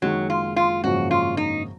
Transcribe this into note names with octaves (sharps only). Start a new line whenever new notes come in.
F#1 F#2 D#3 F#3 G#3
F4
F4
G#1 F#2 C#3 F3 A#3 F#4
F4
D#4